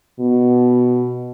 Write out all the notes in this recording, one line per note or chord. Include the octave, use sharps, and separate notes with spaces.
B2